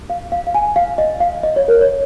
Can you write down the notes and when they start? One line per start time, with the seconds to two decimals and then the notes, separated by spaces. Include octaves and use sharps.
0.10 F5
0.32 F5
0.47 F5
0.54 G#5
0.76 F5
0.98 D#5
1.20 F5
1.43 D#5
1.56 C#5
1.68 A#4
1.81 C#5